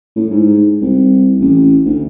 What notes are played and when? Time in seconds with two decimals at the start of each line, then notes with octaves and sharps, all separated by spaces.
0.16 A2
0.31 G#2
0.81 C2
1.40 A1
1.85 D2